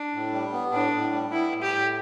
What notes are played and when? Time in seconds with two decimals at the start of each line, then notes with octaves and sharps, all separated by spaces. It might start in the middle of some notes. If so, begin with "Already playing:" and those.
Already playing: D4
0.13 A2
0.32 G3
0.53 B3
0.72 A2 D4
0.93 A2
1.12 G3
1.32 B3 E4
1.52 A2
1.62 G4
1.72 A2